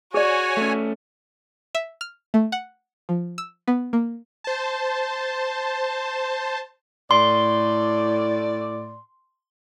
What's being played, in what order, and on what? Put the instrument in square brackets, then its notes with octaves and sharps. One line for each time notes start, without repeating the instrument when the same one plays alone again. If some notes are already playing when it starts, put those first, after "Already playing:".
[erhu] F#4 [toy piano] G#4 D5 [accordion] C#5 G#5
[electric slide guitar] A3 C#4
[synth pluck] E5
F6
A3
F#5
F3
E6
B3
A#3
[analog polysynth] C5 A5
[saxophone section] A2 D5 [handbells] C6